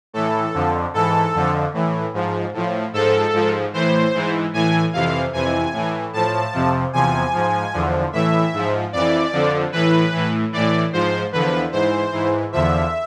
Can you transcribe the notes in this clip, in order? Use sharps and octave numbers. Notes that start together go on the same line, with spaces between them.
A2 E3 A4
F2 D3 F3
G#2 E3 A4
F2 D3 F3
A2 E3
G#2 F3
A2 F3
G#2 F3 A4
G#2 F3
A2 E3 C5
G#2 E3
A2 E3 G#5
F2 C3 E3 F5
F2 C3 E3 G#5
A2 E3
A2 F3 A5
F2 C3 F3
E2 C3 F3 G#5
G#2 F3
E2 D3 F3
A2 E3 E5
G#2 F3
F2 E3 D5
F2 D3 F3
A2 E3 B4
A2 E3
A2 E3 D5
G#2 F3 C5
E2 D3 F3 B4
G#2 E3 C5
G#2 E3
E2 D3 F3 E5